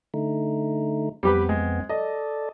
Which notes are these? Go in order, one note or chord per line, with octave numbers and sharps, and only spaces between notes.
D3 A3 D#4
F2 G3 B3 C4 G4 B4
G#3
A4 D5 D#5